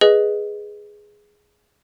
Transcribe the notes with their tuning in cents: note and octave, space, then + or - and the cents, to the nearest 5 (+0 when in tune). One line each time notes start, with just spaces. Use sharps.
G#4 +0 B4 -5 D#5 +0